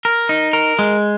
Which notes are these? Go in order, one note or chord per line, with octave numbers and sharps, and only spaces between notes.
A#4
D#4
A#4
G#3